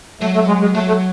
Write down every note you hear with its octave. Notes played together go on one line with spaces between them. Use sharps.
F#3 A3
A3
G#3
G#3
F#3 A3
A3